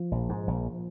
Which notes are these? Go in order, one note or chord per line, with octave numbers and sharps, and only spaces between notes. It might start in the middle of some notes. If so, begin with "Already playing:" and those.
Already playing: F3
A#1
G#2
A#1